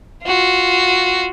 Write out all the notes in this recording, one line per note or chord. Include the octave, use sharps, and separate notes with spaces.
F4 F#4